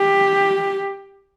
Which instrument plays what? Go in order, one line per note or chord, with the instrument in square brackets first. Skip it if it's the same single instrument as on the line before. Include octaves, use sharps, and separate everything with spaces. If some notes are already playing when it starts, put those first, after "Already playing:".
Already playing: [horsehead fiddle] G4